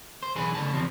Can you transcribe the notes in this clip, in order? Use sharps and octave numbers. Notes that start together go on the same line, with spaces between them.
C5
B1 E3 G#4 B4
A2 C#3 A5
E2 C3 F3